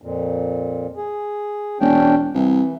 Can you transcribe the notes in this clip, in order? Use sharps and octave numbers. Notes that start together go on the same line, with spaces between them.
F2 A#2
G#4
E1 C#4 D4 G5
C2 E3